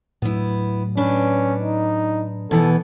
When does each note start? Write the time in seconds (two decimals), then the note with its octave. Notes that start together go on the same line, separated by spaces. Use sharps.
0.22 A2 F#3 B3 E4
0.97 C#4 D4 B4
1.61 D#4
2.51 B2 E3 B3 A4